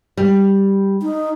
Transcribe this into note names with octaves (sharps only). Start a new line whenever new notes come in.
G3
D#4